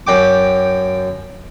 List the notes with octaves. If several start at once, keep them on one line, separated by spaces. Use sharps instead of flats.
F#2 G5 D6